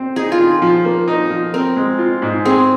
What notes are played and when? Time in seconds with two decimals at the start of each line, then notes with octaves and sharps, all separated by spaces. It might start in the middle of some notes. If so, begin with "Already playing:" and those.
Already playing: C4
0.16 D#4 G#4
0.32 F4
0.39 D#3
0.62 F3
0.85 A#3
1.08 D#4
1.30 F3
1.53 C4 A#4
1.77 G#3
1.99 F4
2.22 G#2
2.45 C4 G#4